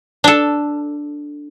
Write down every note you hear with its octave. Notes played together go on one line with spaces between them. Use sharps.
D4 A4